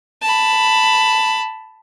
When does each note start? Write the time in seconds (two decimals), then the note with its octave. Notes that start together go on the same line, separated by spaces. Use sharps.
0.22 A5 B5